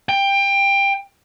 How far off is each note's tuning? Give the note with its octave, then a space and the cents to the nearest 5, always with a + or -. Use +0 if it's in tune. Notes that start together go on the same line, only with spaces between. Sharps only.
G5 +20